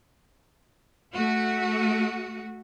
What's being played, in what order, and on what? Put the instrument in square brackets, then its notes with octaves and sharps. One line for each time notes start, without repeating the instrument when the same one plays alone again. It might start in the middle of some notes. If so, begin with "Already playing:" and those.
[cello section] A3 F#4